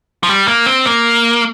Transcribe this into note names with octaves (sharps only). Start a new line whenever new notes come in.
F3
G3
A#3
C4
A#3